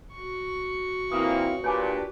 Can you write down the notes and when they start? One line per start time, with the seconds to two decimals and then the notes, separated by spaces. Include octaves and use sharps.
0.13 F#4 C#6
1.12 A#2 E3 A#3 C4 F5 D#6
1.64 A#2 D4 G4 B4 C#5 G#5 D6